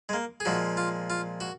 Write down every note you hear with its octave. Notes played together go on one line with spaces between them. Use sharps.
G#3
A#3
G#4
A#2 F3 G#3 F#4
F4
F4
F#4